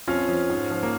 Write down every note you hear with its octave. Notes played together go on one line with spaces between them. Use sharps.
F2 C#4 F4
F3
G#2
F3
A#3